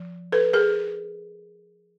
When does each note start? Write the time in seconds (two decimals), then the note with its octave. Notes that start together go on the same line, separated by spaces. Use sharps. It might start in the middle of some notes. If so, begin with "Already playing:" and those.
Already playing: F3
0.32 A4 B4
0.53 G#4 A#4